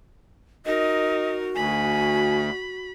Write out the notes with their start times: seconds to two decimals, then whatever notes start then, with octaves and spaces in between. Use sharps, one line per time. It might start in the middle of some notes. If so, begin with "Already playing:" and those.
0.66 D#4 F#4 A#4 D#5
1.56 D2 G#5 B5